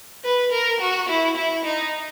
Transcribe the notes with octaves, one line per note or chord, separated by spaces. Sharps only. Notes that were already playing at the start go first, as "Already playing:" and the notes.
B4
A#4
F#4
E4
E4
D#4